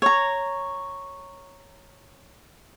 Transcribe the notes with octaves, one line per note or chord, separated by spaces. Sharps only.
C#5 A#5